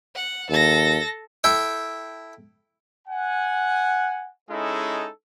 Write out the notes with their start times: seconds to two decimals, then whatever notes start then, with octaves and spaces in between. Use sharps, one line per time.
0.16 F#5
0.50 D#2 A4 A#6
1.44 E4 A4 G5
3.08 F#5 G#5
4.50 G#3 C#4 D#4 E4 G#4 A4